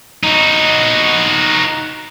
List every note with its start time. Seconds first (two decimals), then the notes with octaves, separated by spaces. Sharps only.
0.23 D#4 F#4